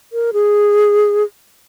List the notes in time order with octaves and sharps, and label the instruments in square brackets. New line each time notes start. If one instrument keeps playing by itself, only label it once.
[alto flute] A#4
G#4